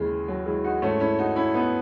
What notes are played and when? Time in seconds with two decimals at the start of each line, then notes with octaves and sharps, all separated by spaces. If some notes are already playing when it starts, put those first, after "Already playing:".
Already playing: D#2 C#3 E3 G#3
0.28 F#3
0.46 E3 G#3
0.64 D#4 F#4
0.82 G#2 E3 A3 C#4
1.00 C#4 E4
1.19 D#4 F#4
1.36 C#4 E4
1.54 B3 D#4